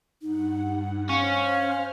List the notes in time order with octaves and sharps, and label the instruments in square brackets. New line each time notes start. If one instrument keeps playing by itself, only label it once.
[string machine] G2 F#5 [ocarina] D#4
[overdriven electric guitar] C#4 [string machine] C5 F6 [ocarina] F5